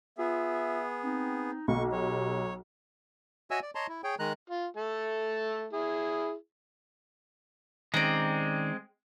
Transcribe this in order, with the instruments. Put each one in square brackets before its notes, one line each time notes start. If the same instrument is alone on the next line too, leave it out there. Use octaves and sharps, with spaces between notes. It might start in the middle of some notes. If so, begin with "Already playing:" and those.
[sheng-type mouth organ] B3 G#4 [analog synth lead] F4 [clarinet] E5
[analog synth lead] C4 [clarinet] D#4
[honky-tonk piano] B1 [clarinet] A#3 [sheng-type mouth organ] C#6
[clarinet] F#3 [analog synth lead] G4 [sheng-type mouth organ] C#5
[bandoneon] F#4 C#5 D#5 E5 G#5 E6
D5
C#5 D#5 A5 A#5 C6
E4
G#4 C#5 G5
D#3 G#3 A#5 F#6
[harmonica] F4
A3 A5
E4 G#4
[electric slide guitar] D#3 C#4 [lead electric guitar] G#3 C4 [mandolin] D5 A#5